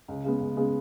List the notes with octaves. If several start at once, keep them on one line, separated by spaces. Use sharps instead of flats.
C#2
C#3 G#3 B3
C#2
C#3 G#3 B3